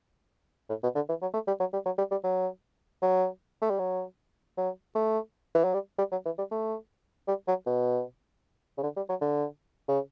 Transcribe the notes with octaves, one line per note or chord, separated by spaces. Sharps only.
A2
B2
D3
E3
F#3
A3
G3
F#3
G3
F#3
G3
G3
F#3
F#3
A3
G3
F#3
F#3
A3
E3
F#3
G3
G3
F#3
E3
G3
A3
G3
F#3
B2
C#3
D3
G3
F#3
D3
C#3